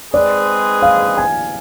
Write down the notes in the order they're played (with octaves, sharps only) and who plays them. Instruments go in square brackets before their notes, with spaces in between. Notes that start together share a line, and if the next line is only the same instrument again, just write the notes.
[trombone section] G#2 G#3 C4 G#4 B4 [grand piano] D5
[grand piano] F5
G#5